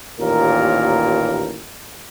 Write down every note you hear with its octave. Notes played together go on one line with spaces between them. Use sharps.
A1 D#2 A#2 A#3 A#4